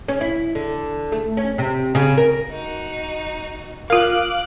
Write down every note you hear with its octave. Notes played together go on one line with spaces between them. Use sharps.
C#4
E4
D3
A3
C#4
C3
C#3
A#4
D#4 F#4
F4 A#4 F5 D6 F#6